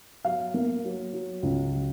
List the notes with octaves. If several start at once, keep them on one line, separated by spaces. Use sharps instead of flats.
F#3 F5
A#3
F#3
F#3
C#2
F#3